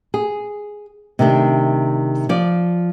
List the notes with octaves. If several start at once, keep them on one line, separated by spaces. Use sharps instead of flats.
G#4
C3 D#3 A3 D4
F3 D5